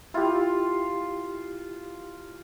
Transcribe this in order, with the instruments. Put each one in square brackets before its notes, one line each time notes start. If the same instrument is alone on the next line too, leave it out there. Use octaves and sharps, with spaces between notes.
[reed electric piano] E4 G4 [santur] F4